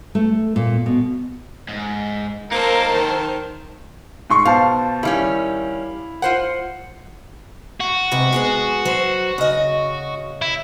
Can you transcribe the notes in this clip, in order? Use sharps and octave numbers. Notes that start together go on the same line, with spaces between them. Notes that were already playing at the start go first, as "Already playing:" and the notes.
A3
A#2
B2
G#2
A#3 D#4 A4 A#4 C5 A5
D#3
G#2 C6 C#6
B2 C5 F5 A5
D#3 G3 C#4 E4 F5
F4 C5 F#5
F#4
G#2 C3 B4
G#3 B3 G#4
F#3 C5
C#3 D#5
E4